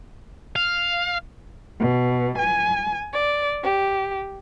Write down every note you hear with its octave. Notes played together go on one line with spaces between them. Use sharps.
F5
B2
G#5
D5
G4